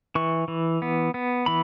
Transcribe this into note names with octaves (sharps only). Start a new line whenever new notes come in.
E3 C#6
E3
B3
B3
E3 B5